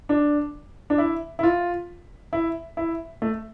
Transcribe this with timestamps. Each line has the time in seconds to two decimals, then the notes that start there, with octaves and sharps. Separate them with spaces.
0.09 D4
0.90 D4
0.98 E4
1.39 E4
1.43 F4
2.33 E4
2.77 E4
3.22 A3